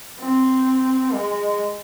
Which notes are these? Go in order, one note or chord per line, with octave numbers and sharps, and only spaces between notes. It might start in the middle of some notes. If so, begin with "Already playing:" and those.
C4
G#3